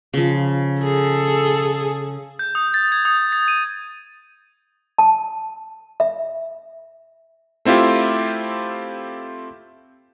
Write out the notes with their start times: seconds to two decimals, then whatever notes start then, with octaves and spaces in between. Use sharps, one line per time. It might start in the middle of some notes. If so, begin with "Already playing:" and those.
0.13 C#3 F3
0.81 G#4 A4
2.39 G6
2.55 D#6
2.74 A6
2.92 G#6
3.05 D#6
3.32 A6
3.48 D#7
4.98 A5
6.00 E5
7.65 A3 C4 E4 F4 G4